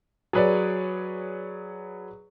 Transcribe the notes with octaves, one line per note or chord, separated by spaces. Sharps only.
F#3 G#4 B4 C#5 D5